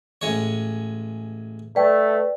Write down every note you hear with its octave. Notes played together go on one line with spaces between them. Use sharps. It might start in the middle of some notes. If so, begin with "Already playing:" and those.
A1 G#3 C#5
A3 B4 D5 G5